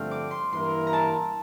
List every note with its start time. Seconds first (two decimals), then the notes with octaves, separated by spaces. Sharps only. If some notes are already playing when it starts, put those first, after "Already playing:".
Already playing: G2 D3 F3 A3 C4 F6
0.11 D6
0.31 C6
0.52 G2 E3 A#3 E4 A#4 C6
0.87 A#5
0.93 A5